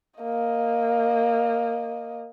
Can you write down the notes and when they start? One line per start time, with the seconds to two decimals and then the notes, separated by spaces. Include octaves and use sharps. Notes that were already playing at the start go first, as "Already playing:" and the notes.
0.20 A#3 D#5